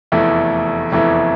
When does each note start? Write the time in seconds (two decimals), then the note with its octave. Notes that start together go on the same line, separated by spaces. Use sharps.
0.12 F1 E2 E3 A3 E4
0.92 F1 E2 E3 A3 E4